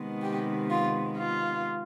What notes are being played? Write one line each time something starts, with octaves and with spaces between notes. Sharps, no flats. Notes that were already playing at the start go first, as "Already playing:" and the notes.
Already playing: C3 D#3 G#3 B3
G4
F4
F4